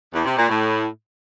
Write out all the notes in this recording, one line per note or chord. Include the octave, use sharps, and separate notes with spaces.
E2
C3
A#2
A2